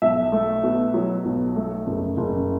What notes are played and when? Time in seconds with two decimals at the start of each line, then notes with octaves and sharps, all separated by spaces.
0.02 B1 E5
0.32 A3
0.63 B2
0.94 F#3
1.25 B1
1.56 A3
1.86 F#1
2.17 F#1